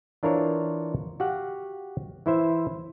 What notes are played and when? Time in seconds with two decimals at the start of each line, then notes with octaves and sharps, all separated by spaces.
0.23 E3 D4 F4 A#4 C5 C#5
1.20 F#4 G4 F5 F#5
2.26 E3 E4 C5 E5